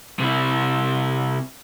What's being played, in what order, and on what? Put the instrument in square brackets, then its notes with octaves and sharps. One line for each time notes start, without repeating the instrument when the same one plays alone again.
[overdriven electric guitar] C3 E4